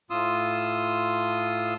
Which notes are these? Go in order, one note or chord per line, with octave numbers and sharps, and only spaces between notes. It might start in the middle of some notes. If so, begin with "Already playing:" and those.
A2 F4 C6 D#6 E6